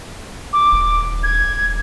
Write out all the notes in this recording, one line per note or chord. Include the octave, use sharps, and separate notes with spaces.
D6
D#1
G#6